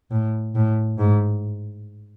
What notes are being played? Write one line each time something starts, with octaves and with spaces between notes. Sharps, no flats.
A2
A2
G#2